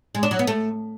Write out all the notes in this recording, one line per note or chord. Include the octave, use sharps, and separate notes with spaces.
G#3
D4
F#3
B3
A3